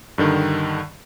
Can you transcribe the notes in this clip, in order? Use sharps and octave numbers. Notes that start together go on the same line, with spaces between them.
G2 D3 D#3